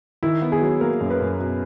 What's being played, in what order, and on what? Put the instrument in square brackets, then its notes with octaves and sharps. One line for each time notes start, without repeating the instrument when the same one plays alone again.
[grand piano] D#3 [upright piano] E4
[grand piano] B3
[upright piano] G#4
[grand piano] F#3
[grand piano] A#3 [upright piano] A#4
[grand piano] F#2
[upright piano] B4
[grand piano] F#2
B2